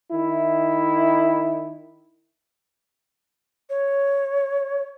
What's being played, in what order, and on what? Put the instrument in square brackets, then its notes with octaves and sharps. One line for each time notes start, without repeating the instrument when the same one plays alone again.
[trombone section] D#3 E4
[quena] C#5